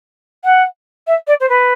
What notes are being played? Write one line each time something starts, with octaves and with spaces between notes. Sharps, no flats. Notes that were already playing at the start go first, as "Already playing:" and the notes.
F#5
E5
D5
C5
B4